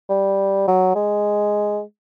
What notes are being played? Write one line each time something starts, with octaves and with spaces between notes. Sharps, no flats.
G3
F#3
G#3